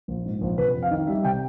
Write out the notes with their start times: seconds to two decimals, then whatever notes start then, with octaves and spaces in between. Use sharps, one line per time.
0.08 A#1
0.25 G#2
0.41 A#1
0.58 C3 B4
0.74 F2
0.83 F5
0.91 D#3
1.07 G3 E5
1.24 C3 G5